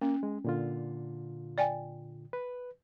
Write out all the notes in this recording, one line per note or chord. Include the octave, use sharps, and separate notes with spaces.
A#3 C#4
G#3
A#2 D3 F4
D5 G5 G#5
B4